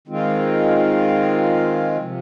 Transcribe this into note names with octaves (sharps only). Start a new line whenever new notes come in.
D#3 G#3 C4 F4
C3 F3